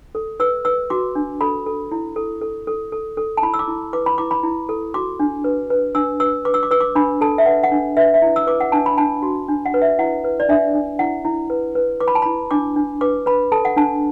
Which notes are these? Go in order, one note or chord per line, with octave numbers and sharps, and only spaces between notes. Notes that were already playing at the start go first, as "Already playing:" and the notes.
A4
B4 E6
B4 E6
F#4 D6
D4
A4 B5
A4
E4
A4
A4
A4
A4
A4
A5
E4 B5
E6
D6
E4
B4 D6
B5
E4 D6
B5
E4
A4
F#4 D6
D4
B4
B4
D4 E6
B4 E6
B4 D6
E6
D6
B4 E6
D6
D4 B5
A4 A5
E5
B4 F#5
F#5
D4
B4 E5
E5
E4
E6
B4 D6
F#5
D4 A5
B5
D4 A5
F#4
D4
F#5
B4
E5
E4 F#5
B4
D5
D4 E5
D4
E4 F#5
E4
B4
B4
B4 D6
B5
A5
B5
E4
D4 D6
D4
B4 D6
B4 B5
A4 A5
F#5
D4 A5